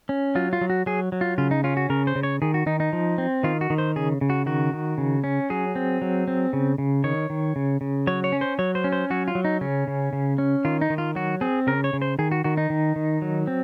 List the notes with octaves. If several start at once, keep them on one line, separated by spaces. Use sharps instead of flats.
C#4
F#3 F4
F4
F#3
F#4
F#3 G#4
F#3
F4
C#3 F4
D#4
C#4 F4
F#4
C#3 A#4
C5
C#3
C#5
D#3 G#4
F#4
D#3 D#4
D#4
F3
C4
D#3 F4
F#4
D#3
C5
C#3 G#4
C#3
F#4
D#3 F#4
D#3
C#3
C#4
F#3 G#4
C4
F#3
C4
C#3
C#3
D#3 C#5
D#3
C#3
C#3
F#3 C#5
C#5
C#4
C5
F#3 C#5
C5
C#4
C5
F#3 F#4
F4
F#3
D#4
C#3 C#4
C#3
C#3
C#4
D#3 F4
D#4
D#3
F4
F#3 F#4
C4 G#4
C#3 A#4
C#5
C#3
C5
D#3 G#4
F#4
D#3 F#4
D#4
D#3
D#3
F#3
C4